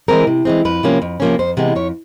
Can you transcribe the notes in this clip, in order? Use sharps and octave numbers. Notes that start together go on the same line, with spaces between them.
E3 G#3 C4 A#4
C3
E3 G#3 C4
F2 B4
C3 F3 A#3 C#4
F2
C3 F3 A#3 C#4
F2 C5
C3 E3 G#3 B3
F2 C#5